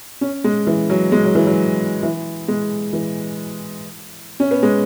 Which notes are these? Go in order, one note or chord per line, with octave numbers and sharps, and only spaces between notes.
C#4
G#3
E3
F#3
G#3
F#3
E3
F#3
E3
G#3
E3
C#4
B3
G#3